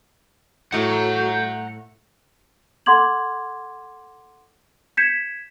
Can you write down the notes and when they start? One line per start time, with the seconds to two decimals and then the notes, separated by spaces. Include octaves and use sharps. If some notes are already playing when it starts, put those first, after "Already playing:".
0.72 A2 A3 F#4 F#5 A#5 G6
2.86 A4 F#5 C6 D6 G#6 F#7
4.97 G6 G#6 B6 C#7 E7